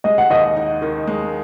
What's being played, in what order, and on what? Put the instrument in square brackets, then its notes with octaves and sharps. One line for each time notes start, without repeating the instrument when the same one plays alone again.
[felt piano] G#3 [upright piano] D#5
[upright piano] F#5
[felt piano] D#2 [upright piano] D#5
[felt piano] D#4
D#3
G#3